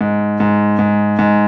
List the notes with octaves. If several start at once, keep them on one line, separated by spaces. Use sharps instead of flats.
G#2
G#2
G#2
G#2